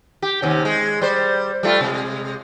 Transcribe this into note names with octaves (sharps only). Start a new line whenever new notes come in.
G4
D#2 C3 C#4
G#3
G3 C5
G3 A3 F4
C3 G#3